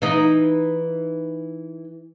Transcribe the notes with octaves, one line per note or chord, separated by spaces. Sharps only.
E3 D#4